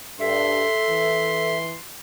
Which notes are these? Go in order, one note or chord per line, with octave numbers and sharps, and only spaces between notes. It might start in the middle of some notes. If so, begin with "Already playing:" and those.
G2 A4 E5 C6
E3